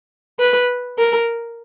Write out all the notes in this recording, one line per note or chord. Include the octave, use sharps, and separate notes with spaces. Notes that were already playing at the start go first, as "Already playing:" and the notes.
B4
A#4